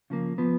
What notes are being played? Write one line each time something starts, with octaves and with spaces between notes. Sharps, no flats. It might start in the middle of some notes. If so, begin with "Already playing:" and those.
C#3 F3 A#3
F3 B3